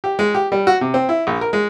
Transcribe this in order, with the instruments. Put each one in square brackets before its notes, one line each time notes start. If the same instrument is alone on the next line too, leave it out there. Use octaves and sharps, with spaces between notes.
[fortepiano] G4
G#3
G4
G3
F#4
C3
C4
E4
A#1
A#4
G#3